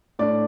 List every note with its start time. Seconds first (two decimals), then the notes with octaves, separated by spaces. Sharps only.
0.19 A2 A3 D4 D5